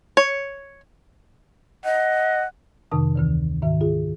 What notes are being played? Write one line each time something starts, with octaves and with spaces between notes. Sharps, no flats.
C#5
D#5 F#5
F2 C3 D#3 A5 D#6
D2 D#3 E3
G#2 D#3 E5
F4 G#4